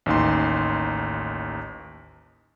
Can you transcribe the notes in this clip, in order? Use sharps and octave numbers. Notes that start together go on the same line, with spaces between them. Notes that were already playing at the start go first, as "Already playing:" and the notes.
A1 D#2 D#4 C6